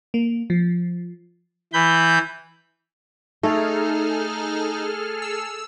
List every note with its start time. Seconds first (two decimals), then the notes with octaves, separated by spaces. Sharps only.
0.14 A#3
0.50 F3
1.73 E3 B5 G6
3.43 A3 D#4 G#4 A4 F6
5.22 E6